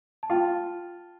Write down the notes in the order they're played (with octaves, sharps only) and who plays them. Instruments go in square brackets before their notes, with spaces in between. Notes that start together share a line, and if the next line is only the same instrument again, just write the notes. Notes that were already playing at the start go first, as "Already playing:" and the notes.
[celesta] A5
[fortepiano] F4 [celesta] G5